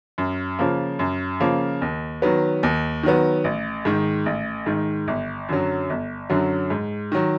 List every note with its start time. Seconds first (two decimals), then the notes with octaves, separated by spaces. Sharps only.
0.18 F#2
0.59 C#3 F3 A#3
0.99 F#2
1.40 C#3 F3 A#3
1.82 D#2
2.22 D#3 F#3 B3
2.63 D#2
3.03 D#3 F#3 B3
3.44 A1
3.85 G#2 D#3
4.26 A1
4.66 G#2 D#3
5.08 G1
5.49 F#2 D3 F#3
5.90 G1
6.30 F#2 D3 F#3
6.70 G#2
7.12 D#3 F#3